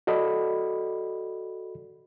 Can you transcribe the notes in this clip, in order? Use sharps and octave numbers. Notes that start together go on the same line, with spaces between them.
F#4 A4 D5 D#5 B5